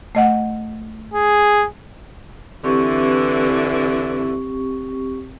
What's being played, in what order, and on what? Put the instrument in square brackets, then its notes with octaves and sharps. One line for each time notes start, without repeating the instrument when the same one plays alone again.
[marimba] A3 D#5 F#5
[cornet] G#4
[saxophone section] D3 E3 [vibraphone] C4 G4 C#6